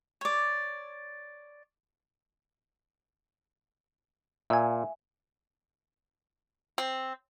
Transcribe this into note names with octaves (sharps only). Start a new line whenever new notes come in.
C#5 D5
A#2 E5 G#5
C4